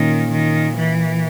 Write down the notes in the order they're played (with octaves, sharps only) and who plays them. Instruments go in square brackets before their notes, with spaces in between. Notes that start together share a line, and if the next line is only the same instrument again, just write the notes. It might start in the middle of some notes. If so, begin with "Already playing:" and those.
Already playing: [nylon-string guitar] A#2 C#4 [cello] D#3
[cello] D#3
E3